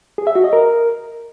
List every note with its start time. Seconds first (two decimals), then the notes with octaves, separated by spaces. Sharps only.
0.18 G#4
0.27 E5
0.35 F#4
0.44 D#5
0.53 A#4